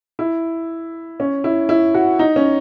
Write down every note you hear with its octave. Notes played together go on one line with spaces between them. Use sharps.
E4
C#4
E4
E4
F#4
D#4
C#4